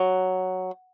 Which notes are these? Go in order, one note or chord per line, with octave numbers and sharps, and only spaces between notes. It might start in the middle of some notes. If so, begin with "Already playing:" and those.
Already playing: F#3